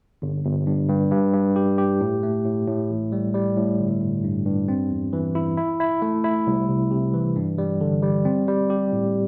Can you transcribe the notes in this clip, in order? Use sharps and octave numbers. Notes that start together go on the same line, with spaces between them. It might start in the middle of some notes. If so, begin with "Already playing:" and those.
G1
G1
G2
G2
G2
G2
G4
G4
A2
A3
A2
A2
A1
G3
G3
A2
G1
G1
G2
G2
C4
E2
E3
E4
E4
E4
A3
E4
C2
C3
C3
E3
G2
G3
D3
G3
C4
G3
G4
A2